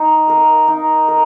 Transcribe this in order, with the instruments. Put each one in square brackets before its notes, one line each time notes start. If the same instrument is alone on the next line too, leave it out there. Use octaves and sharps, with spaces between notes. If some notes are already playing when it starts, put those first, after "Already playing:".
Already playing: [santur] D#4
A#4 F5
D#4
A#4